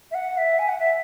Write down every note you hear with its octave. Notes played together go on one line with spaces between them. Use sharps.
E5
F#5
E5
G#5
F#5
E5